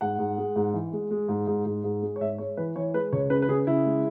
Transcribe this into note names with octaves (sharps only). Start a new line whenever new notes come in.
G#2 F#5
G#2
G#3
G#2
E3
G#3
G#3
G#2
G#2
G#2
G#2
G#3
C#5
G#2 E5
G#3 C#5
E3 B4
E3 C#5
G#3 B4
C#2 C#5
C#3 B4
B4
C#3 G#4
C#3 E4
G#3